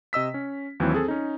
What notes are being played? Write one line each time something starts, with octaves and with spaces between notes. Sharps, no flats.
C3 D#5 E6 B6
C#4
D#2 E3 F#3 C4 E4
C4 G#4 A4
C#4 D#4